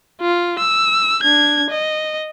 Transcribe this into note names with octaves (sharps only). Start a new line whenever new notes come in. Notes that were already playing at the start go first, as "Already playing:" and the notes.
F4
E6
D4 G#6
D#5